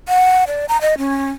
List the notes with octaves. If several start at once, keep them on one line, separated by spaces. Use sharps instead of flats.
F#5
D5
A#5
D#5
C#4